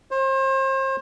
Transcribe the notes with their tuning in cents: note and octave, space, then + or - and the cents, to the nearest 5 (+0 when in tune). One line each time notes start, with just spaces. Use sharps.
C5 +35